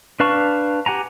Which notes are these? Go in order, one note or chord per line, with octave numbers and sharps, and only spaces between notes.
D4 B4 F5 A5 C#6
G4 F#5 G#5 A#5